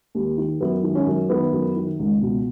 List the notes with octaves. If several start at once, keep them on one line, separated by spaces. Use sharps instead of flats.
D#2
D#3
F#2 B3
D#3
C#4
F#2
D#3 B3
F#2
D#3
C#2
B2